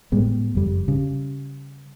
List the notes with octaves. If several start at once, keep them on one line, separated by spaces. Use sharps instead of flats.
A2 G3 G#3 B3
F#1 F2 G3
C#3 G3